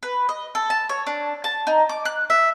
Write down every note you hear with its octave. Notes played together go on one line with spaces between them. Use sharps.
B4
D#5
A4
A5
C#5
D4
A5
D#4
D6
F#6
E5